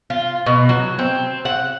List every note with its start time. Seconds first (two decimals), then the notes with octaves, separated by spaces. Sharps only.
0.10 F4
0.46 B2
0.69 F#3
0.99 C4
1.45 F#5